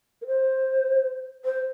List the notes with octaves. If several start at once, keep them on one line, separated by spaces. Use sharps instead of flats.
A#4
C5
C5